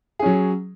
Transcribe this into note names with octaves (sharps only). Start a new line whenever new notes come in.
F#3 C#4 G#4